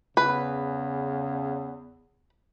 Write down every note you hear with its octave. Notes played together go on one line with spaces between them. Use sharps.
E2 C#3 B4